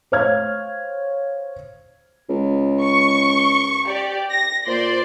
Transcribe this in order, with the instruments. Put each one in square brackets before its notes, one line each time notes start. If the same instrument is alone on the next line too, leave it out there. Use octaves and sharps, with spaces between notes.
[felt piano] C5 C#5 F5 F6 G#6
[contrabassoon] C#2
[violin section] C#6
G4 D5
A#6
[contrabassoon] A#2 [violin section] C5 D5 C6